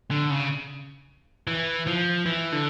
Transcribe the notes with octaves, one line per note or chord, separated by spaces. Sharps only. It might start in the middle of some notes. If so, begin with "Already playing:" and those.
D3
C#3
E3
F3
E3
D3